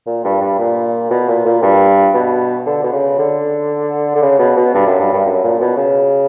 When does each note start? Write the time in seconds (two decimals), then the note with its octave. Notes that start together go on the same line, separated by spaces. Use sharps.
0.07 A#2
0.25 G2
0.41 G2
0.59 A#2
1.11 B2
1.28 A#2
1.46 A#2
1.62 G2
2.14 B2
2.66 D3
2.84 B2
2.93 C#3
3.18 D3
4.15 D3
4.22 C#3
4.39 B2
4.57 B2
4.74 G2
4.87 F#2
5.00 G2
5.13 G2
5.26 F#2
5.44 A#2
5.60 B2
5.77 C#3